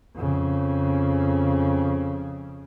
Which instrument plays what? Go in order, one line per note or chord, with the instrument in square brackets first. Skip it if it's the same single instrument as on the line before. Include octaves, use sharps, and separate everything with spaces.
[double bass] F2 C#3